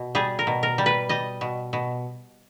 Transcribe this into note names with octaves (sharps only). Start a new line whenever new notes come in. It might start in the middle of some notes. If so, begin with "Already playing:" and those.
Already playing: B2
G3 G#4
A#4
B2
A#4
G3
B4
G3 D#5
B2
B2